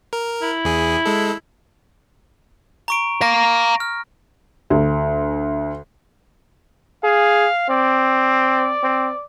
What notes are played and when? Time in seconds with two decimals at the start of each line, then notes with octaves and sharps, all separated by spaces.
0.13 A#4
0.42 E4
0.65 E2 G#4
1.06 G#3 A4
2.88 A#5 C#6 D7
3.22 F5 A#5 A#6
3.80 F6
4.70 D2
7.04 G#4 F5
7.69 C4 D5
8.83 C4